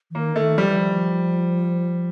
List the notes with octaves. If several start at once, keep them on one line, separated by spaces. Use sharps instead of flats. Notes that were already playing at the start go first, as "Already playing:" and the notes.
E3
D#3 A#3
D#3 A3
F3 G3
E3
F3